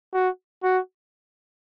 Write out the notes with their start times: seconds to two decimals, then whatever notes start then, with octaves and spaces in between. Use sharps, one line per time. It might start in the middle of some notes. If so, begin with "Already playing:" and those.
0.13 F#4
0.63 F#4